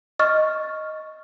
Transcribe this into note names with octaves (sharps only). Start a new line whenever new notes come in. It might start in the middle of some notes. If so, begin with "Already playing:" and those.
D#5 C#6 F6 A6